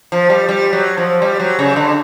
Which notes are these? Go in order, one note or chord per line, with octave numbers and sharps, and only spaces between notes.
F3
G3
G3
F#3
F3
G3
F#3
C#3
D3